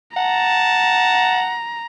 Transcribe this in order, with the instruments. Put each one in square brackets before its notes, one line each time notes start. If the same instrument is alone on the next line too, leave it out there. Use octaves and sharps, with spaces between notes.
[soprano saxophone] F#5 [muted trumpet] A5 [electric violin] A#5